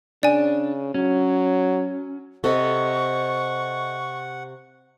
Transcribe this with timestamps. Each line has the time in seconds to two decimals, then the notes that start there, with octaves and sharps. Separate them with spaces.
0.23 C#3 D4 D5 G#5
0.94 F#3 C#4
2.44 C3 A4 D#5 F#5 C#6